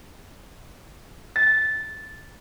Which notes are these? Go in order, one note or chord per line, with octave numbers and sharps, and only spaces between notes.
A6